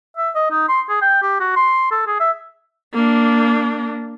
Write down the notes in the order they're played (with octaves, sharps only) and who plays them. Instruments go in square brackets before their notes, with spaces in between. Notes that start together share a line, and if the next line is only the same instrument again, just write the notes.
[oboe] E5
D#5
D#4
C6
G#4
G5
G4
F#4
C6
A4
G#4
E5
[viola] A#3 D4